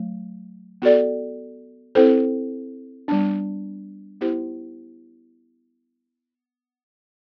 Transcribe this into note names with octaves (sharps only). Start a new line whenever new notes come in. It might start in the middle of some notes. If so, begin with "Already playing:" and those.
Already playing: F#3 A3
B3 F#4 A4 D5
C4 E4 A4 C5
G3 B3 D4
B3 E4 G4 C5